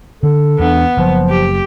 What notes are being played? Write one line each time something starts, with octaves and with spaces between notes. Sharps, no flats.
D3 A4
E2 B3 D4
F#1 F3
G4